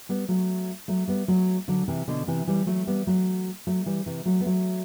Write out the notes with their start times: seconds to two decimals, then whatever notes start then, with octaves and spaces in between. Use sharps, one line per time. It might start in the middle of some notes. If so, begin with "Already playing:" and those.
0.09 G3 B3
0.28 F#3 A3
0.88 F#3 A3
1.08 G3 B3
1.28 F#3 A3
1.68 D3 F#3
1.88 C3 E3
2.08 B2 D3
2.27 C3 E3
2.47 E3 G3
2.66 F#3 A3
2.87 G3 B3
3.07 F#3 A3
3.67 F#3 A3
3.86 E3 G3
4.06 C3 E3
4.25 F#3 A3
4.40 B3
4.46 F#3 A3